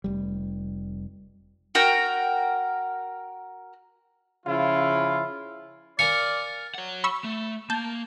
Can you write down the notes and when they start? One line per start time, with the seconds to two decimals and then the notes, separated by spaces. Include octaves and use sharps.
0.04 F1 G3
1.75 F#4 A#4 G5
4.46 C#3 F3 E4 F4
5.99 A#4 D5 F5 G#5 C#7
6.74 C#5 F#5
7.04 B5 C#6 E6
7.24 A3
7.70 A#3 A5 G6